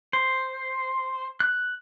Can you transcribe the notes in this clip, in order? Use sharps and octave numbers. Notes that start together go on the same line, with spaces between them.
C5
F#6